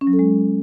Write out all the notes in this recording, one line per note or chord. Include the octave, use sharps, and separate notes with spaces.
C#4
F#3
A4
G#3